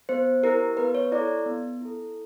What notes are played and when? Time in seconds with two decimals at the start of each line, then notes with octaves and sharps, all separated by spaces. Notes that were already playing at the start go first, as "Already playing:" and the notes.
0.09 B3 C5
0.43 E4 G4 A#4
0.77 B3 B4
0.95 C#5
1.12 E4 A4 D5
1.46 B3
1.81 E4 A4